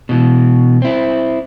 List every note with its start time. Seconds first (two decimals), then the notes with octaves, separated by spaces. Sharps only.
0.09 B2 E3
0.82 C4 E4